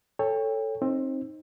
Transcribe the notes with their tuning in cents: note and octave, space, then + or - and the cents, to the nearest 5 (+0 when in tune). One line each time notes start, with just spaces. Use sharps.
A4 +5 C#5 +0 G5 +30
C4 +25 D#4 +0